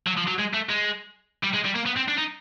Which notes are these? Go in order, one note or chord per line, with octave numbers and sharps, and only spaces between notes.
F#3
F3
F#3
G#3
A3
G#3
G3
G#3
G3
A#3
B3
C4
D4
D#4